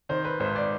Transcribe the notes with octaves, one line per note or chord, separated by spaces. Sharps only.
D#3 C5
B4
G#1 C5
D5